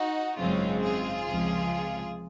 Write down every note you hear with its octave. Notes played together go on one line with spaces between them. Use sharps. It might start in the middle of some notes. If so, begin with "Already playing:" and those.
Already playing: D#4 F#4
G#1 F#2 C#3 G#3 C4 C#4 F4
F4 G#4
C#2 C3 F3